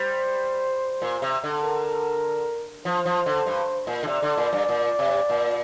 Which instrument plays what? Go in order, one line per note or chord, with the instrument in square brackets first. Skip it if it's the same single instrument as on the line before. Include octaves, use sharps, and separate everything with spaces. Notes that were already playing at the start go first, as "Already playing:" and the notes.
Already playing: [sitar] G3 [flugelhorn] C5
[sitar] A#2
C3
D3
[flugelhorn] A#4
[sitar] F3 [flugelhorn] C5
[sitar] F3
D3
G2
A#2
D3
[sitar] C3 [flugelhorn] D5
[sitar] D3
A#2
G2
A#2
C3
A#2